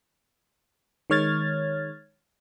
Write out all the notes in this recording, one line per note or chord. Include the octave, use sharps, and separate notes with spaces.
D#3 G#3 C#5 F6 G#6 A6